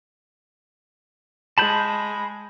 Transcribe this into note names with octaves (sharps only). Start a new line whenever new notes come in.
G#3 A5 B5 G6